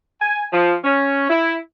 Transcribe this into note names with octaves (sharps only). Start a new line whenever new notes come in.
G#5
F3
C#4
E4